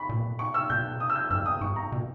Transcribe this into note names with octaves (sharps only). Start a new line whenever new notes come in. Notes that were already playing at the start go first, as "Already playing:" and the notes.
Already playing: B5 C#6
A#2
C#6
E6
B2 G6
D#6
E6
G6
G2 E6
D#6
G#2 C#6
A#5
B2